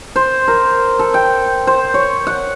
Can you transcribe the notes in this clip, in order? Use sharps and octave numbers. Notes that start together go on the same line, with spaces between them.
C5
A#4
A4
G5
C5
C#5
F#5